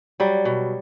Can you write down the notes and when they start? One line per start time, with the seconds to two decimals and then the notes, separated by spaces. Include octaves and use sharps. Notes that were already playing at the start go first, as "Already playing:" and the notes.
0.20 F#3 G3
0.45 B2